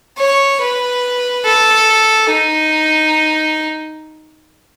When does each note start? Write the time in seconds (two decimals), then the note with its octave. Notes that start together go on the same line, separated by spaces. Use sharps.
0.18 C#5
0.61 B4
1.45 A4
2.30 D#4